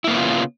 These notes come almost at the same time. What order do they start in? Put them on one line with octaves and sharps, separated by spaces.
E4 A#3 B3 C#3 F4